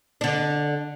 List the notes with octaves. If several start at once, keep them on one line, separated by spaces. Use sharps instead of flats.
D3 D4